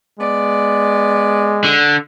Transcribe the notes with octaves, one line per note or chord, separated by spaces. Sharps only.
G#3 B3 D5
D3